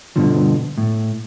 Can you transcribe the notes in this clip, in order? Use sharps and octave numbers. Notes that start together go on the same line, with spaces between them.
G2 B2 D3 F3
A2